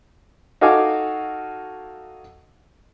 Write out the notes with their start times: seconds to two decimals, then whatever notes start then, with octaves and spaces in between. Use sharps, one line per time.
0.61 D#4 F#4 A4 F5 G#5 D6